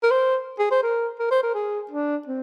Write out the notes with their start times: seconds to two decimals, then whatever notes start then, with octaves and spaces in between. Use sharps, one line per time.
0.03 A#4
0.11 C5
0.59 G#4
0.71 C5
0.83 A#4
1.19 A#4
1.31 C5
1.43 A#4
1.55 G#4
1.91 D4
2.27 C4